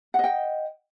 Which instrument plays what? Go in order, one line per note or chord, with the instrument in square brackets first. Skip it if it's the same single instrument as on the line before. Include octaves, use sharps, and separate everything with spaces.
[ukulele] F#5
D#5
G5